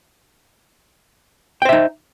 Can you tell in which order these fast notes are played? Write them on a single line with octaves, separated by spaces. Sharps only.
G5 C5 E5 D#4